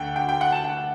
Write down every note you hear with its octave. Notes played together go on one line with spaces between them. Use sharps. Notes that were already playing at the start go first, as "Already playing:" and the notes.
Already playing: D2 D3 F#5 G5
G5
G5
F#5
A5
G5